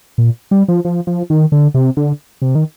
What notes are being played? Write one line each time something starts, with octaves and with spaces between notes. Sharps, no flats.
A#2
G3
F3
F3
F3
D#3
D3
C3
D3
C3
D#3